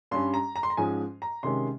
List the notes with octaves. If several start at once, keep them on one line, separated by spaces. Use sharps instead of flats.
G2 G3 C#4 C6
A#5
A#5
C6
A#5
G#2 F3 G#3 C#4 G#5
A#5
C3 D#3 G#3 C#4 C6